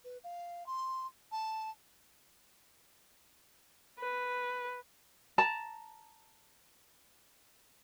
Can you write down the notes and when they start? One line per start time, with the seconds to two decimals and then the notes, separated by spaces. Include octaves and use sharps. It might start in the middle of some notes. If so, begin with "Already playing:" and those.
0.04 B4
0.23 F5
0.66 C6
1.31 A5
3.99 B4
5.38 A5 A#5